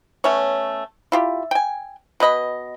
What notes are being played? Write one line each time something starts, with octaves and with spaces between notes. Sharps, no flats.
A3 B3 C#4 C#5
E4 F4 G4
G5 G#5
B2 B4 D#5 B5